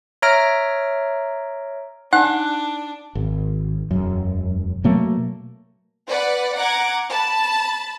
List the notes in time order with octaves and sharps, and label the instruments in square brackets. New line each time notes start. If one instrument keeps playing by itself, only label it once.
[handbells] C#5 E5 A#5 F6 A#6 D7
[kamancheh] D4 [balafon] D#4 G#5 [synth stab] F#5
[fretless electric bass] G#1
E1 F#2
B2 F#3 A3 A#3
[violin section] B4 D5 F#5
F#5 A#5 D6 G#6
A5 B5